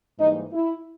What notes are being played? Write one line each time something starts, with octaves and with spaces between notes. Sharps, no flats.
G#2 E3 G3 A#3 D#4
E4